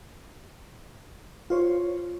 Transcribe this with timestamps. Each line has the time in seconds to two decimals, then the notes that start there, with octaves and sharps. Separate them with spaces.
1.50 F4 C5 C#5